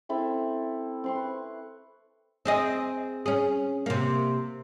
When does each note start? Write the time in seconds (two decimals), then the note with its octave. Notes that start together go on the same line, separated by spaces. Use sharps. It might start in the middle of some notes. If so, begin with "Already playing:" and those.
0.09 C4 E4 A4
1.04 C4 C6 C#6
1.15 B4
2.45 C4 G#4 D#5
3.26 C#4 G#4
3.86 C3 A#3